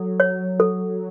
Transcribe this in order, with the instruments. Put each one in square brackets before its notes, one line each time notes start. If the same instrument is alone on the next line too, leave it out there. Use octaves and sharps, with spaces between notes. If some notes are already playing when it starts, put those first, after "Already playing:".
Already playing: [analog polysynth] F#3 [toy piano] A4
[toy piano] C#5
A4